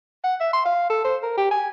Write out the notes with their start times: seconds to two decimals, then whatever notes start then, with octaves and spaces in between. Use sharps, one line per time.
0.24 F#5
0.41 E5
0.53 C6
0.66 F5
0.90 A4
1.04 C5
1.23 A#4
1.37 G4
1.51 G#5